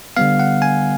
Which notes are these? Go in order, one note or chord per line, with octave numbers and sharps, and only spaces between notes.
D3 G3 B3 F5
F#5
G#5